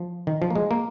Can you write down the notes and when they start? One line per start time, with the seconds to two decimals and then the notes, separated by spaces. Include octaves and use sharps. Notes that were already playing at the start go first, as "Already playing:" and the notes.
Already playing: F3
0.27 D#3
0.42 F3
0.50 A#3
0.55 G#3
0.71 A#3